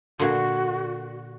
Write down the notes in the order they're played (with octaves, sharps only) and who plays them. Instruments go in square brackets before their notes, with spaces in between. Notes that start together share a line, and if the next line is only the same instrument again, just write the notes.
[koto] A#2 D3 [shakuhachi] F#4